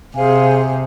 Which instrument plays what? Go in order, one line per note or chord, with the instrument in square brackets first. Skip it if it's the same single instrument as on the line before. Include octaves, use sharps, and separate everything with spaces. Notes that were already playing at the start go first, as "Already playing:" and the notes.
[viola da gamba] C3 [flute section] G#4 C5 F5 G#5